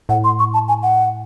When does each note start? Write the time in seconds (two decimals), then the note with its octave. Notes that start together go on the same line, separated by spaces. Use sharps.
0.09 A2 F#5
0.24 C6
0.39 C#6
0.54 A5
0.68 G#5
0.83 F#5